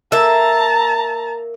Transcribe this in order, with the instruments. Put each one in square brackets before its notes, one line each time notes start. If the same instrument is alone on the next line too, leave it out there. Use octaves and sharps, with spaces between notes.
[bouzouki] A#3 E5 [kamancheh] A5 A#5